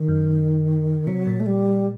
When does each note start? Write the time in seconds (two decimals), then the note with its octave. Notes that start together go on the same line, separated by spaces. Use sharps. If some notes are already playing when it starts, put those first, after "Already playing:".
Already playing: D#3
0.08 F#2
1.07 C3 F#3
1.27 A#2
1.40 A3
1.46 G3